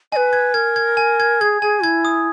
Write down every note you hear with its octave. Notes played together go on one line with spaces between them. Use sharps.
B4 D#5 G#5
G#6
A#4 G#6
G#6
G#5
G#6
G#4 G#6
G#4 G#5
E4 G#6
D#6